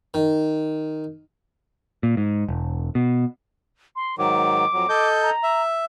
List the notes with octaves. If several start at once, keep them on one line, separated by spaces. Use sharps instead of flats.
D#3
A#2
G#2
E1
B2
C6
G#2 D#3 F#3 D6
F2 F#3
A4 D#5 G6
A#5
E5